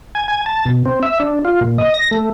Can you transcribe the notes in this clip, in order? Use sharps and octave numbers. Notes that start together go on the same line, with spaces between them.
G#5
G#5
A5
B2
C4
E5
D4
F4
A#2
D#5
A#6
A3